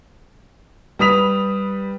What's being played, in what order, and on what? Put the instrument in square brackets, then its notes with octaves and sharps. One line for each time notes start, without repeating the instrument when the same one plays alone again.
[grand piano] G3 B4 D#6 B6 F7